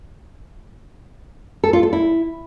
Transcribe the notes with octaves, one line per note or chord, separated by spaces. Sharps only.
A4
F4
A4
E4